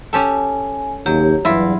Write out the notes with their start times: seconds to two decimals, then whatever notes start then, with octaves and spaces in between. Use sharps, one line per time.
0.13 C#4 G4 A4 G#5
1.06 D#2 F#3 G4
1.45 E2 G2 F#3 E4 F4